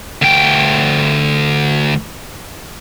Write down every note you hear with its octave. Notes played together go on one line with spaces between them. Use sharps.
D2 G5